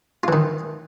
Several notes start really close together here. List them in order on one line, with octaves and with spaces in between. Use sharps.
F4 E3 D#3